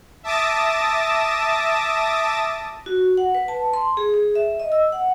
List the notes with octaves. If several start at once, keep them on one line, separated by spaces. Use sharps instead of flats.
E5 A5 D6 D#6 A6 A#6
F#4
F#5
B4
A5
C6
G#4
G#4
E5
D#5
E6
F#5